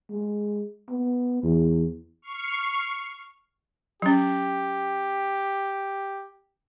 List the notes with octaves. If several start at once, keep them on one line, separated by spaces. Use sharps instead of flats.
G#3
B3
E2
C#6 F6 C7 C#7
F#3 C#4 G4